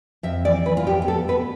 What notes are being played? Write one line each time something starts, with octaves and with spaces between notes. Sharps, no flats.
F2 E5
E3 D5
E3 B4
F4
F2 G4
G4
B3 A4
B3 B4